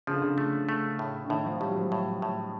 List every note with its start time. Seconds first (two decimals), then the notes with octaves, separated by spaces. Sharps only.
0.07 C#3 F3
0.14 D3
0.22 C#3
0.38 A3
0.69 A3
0.99 A2
1.25 D3
1.30 A2 D#3
1.46 F3
1.61 A2 G3
1.69 F#3
1.76 F3
1.92 A2
2.22 A2